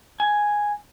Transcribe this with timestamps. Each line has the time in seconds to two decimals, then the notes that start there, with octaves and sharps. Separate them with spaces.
0.20 G#5